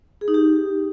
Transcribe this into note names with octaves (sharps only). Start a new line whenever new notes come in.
G#4
D#4
G4